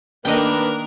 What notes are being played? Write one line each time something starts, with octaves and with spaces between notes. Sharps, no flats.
D#3 A#3 D4 A#4 B4 D#5 G5